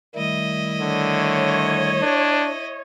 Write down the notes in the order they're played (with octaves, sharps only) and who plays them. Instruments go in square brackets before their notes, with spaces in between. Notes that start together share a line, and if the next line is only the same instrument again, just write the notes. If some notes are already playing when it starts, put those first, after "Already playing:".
[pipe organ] D#3 G3 A3 [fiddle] E4 D#5
[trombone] D3 [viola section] C#5
[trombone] D4